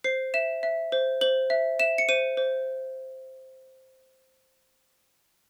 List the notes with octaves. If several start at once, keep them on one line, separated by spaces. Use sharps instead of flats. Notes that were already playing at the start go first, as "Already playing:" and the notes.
C5 C7
E5 E7
E5
C5
C5 F#7
E5
E5 E7
C#7
C5 D#7
C5